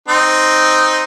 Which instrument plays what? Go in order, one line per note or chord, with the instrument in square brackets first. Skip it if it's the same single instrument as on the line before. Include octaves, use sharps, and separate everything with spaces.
[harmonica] C4 D#4